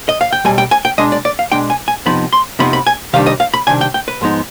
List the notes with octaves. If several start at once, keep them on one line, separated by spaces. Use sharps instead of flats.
D#5
F5
G5
B1 B2 G3 G#5
G5
G#5
G5
B2 G#3 D4 D#5
D5
D5
F5
B2 G#3 D4 G5
G#5
G#5
F2 C3 F3 B3 D#4 B5
C6
F2 C3 F3 B3 D#4 B5
B5
G#5
C3 D#3 G3 D4 F5
D#5
F5
B5
C3 D#3 G3 D4 G#5
G5
G5
B4
G#2 F3 G#3 B3 D#4